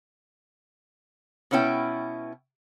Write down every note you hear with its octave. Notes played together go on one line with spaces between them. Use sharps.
B2 B3 C#4 E4 G5